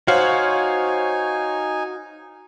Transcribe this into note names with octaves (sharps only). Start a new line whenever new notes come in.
D#4 F#4 C5 C#5 F5 G#5